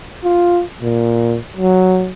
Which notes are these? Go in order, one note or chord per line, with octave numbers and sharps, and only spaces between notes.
F4
A#2
F#3